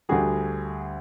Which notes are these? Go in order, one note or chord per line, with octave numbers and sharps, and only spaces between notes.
D2 D3 G3 F#4 G#4